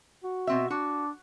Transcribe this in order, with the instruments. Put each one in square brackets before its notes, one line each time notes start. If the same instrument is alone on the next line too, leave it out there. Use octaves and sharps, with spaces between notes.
[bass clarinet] F#4
[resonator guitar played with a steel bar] B2 C4 E5
[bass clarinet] D4 [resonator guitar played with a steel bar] F#4